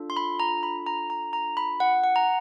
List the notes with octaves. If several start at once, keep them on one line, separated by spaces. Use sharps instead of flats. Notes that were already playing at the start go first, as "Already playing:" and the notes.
Already playing: D4 F4 A4
C6
B5
A#5
B5
A#5
A#5
A#5
B5
F#5
F#5
A#5